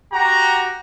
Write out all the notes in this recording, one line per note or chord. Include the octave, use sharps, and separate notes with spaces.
F#4 G4 A#5